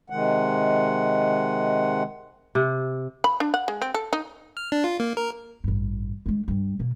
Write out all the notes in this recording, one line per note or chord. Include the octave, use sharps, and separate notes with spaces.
C3 D#3 G#3 F#5
C3
B5
D4
F#5
G#3
C4
A4
D#4
F6
D4
F4
A#3
A#4
A1 G2
D3 G#3
G2 G3
B2 A#3